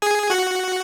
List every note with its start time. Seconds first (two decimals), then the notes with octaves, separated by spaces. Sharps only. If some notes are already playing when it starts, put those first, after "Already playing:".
0.02 G#4 G#5
0.30 F#4 F#5